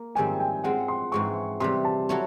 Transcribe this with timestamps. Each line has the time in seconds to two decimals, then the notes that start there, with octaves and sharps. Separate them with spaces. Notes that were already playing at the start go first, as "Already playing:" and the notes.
Already playing: A#3
0.15 G#2 D#3 G3 C4 E4 G#5
0.40 G5
0.64 G#3 C4 F4 F#5
0.88 C6
1.12 G#2 E3 G#3 C4 C#6
1.60 C3 E3 G3 C6
1.85 A5
2.09 F#3 E4 A4 C#5